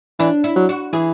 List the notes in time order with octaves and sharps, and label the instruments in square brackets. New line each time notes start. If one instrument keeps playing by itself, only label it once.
[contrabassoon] E3 [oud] D4
[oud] E4
[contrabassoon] F#3
[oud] F#4
[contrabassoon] E3 [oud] G#4